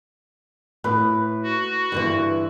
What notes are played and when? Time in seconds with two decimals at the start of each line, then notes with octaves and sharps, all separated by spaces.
0.84 A2 B4
1.43 F#4
1.92 G2 D3 E3